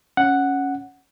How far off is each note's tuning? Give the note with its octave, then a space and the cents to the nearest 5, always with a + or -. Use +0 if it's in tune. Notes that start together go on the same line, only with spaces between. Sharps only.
C#4 +0 F#5 +0